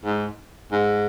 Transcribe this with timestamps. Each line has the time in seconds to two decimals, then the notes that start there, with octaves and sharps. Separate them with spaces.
0.05 G#2
0.72 G#2